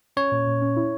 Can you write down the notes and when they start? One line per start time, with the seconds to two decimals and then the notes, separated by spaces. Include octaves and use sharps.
0.17 C#4 C#5
0.32 A#2
0.47 A#2
0.62 C#4
0.76 E4